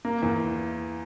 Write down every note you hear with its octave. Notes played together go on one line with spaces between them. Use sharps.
A#3
E2